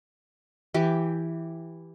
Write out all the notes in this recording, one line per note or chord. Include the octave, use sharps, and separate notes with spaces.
E3 G4